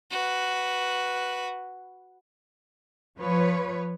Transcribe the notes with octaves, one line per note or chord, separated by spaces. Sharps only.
F#4 B4
F3 B4 C#5